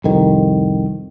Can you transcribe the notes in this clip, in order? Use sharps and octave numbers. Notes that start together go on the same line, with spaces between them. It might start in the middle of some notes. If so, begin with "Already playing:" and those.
C2 F2 D#3